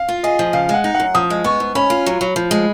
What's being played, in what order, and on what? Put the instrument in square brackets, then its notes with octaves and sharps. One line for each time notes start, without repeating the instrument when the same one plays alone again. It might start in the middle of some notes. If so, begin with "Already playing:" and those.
Already playing: [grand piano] F5
[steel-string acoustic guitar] F4
[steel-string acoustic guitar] G#4 [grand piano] D#5
[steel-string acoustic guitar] F3
[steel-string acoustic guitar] C#3 [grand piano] F5
[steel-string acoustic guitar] G#3 [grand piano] F#5
[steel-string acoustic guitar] D#4
[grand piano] F#5
[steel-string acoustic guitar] F#2
[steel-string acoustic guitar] F3 [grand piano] D#6
[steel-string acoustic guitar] G#3
[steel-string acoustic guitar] B3 [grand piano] C#6
[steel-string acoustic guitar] G#2
[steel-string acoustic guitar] C#4 [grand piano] B5
[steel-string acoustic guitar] F4
F#3
F#3
F3
G#3